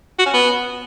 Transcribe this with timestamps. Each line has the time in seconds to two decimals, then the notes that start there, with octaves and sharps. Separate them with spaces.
0.19 F#4
0.26 C#4
0.33 B3